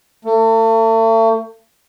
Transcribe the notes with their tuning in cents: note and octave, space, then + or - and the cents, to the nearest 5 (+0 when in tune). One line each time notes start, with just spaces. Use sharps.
A3 +40